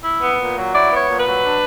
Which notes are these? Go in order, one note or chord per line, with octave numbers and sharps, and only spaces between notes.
E4
B3
A#2
F#3
E4 D5
B3 C#5
A#2
B4
F#3
D4